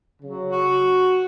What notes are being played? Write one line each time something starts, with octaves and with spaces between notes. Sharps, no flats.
C#3 F#3
F#4